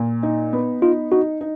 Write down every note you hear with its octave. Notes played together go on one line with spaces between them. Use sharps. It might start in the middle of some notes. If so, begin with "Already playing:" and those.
Already playing: A#2
D#4
B3
D#4 F4
D#4 F#4
D#4